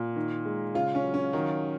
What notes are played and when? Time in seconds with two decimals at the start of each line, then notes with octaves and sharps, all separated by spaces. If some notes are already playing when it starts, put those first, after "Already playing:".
Already playing: A#2
0.16 D#3
0.45 G#3
0.75 C#3 F4
0.95 C#4
1.04 F#3
1.14 C#4
1.33 D#3 F#3